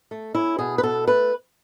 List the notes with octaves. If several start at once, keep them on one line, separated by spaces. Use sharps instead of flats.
A3
C#4 E4
B2 G#4
B4
B2 A4
A3 B4